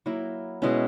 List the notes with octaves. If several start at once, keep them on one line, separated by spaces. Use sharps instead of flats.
F#3 A#3 E4
B2 G#3 C#4 E4